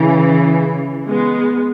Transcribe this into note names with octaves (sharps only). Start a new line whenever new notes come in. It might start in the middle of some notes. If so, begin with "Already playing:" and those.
Already playing: C#3 E3
G#3 B3